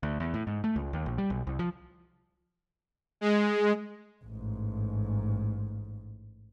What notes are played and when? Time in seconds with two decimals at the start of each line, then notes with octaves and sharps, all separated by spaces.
0.03 D2
0.20 E2
0.34 A2
0.47 G#2
0.64 A3
0.76 C#2
0.93 D#2
1.06 A#1
1.18 G3
1.30 B1
1.47 C2
1.59 F3
3.21 G#3
4.24 A1 G#2